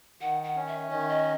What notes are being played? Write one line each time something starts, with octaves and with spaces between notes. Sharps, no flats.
D#3 F#5
F#5
C#4
E5
D#3 D#5
E5
D#5